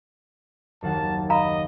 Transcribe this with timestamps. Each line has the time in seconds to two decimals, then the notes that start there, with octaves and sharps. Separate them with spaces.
0.82 F#1 D#2 F#5 A5
1.30 D#5 F5 A#5 B5